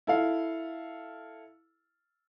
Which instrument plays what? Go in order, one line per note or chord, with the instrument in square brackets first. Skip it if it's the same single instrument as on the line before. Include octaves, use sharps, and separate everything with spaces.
[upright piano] E4 A4 F5